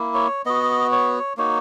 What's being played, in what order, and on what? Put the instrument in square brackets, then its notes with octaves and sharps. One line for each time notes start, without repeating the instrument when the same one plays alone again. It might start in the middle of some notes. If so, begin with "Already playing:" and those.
Already playing: [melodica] A#3 E4
C#5
B3 F#4 D#5
C#5
A#3 D#4 F#4 C#5